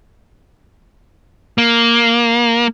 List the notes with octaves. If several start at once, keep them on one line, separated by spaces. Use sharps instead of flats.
A#3